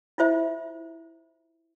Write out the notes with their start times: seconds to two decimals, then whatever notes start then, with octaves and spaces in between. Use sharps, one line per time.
0.18 E4 F4 C5 E5